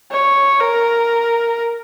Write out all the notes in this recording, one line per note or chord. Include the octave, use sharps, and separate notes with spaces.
C#5
A#4